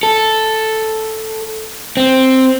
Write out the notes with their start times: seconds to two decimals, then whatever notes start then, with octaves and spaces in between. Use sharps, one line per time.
0.03 A4
1.97 C4